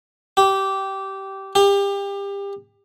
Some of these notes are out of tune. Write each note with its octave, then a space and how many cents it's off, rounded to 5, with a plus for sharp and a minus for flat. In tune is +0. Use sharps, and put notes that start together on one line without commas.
G4 -15
G4 +30